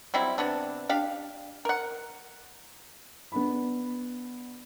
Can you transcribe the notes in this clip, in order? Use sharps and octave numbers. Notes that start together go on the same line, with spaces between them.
F#3 G3 C4 E4
C3 B3 D4
D4 G4 F5
A#4 F#5
B3 D4 B5